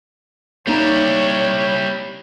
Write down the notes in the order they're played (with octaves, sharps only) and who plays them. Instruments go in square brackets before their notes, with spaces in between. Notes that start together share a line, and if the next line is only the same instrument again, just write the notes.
[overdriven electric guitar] G3 E4 [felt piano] A#3 D#4 [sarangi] C#5